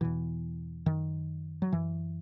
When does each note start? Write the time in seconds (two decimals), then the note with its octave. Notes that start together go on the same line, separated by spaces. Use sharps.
0.01 E2 B2 E3
0.86 F#2 D#3
1.62 F#3
1.72 F#2 E3